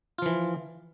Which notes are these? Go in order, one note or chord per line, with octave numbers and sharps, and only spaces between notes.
E3 F3 F4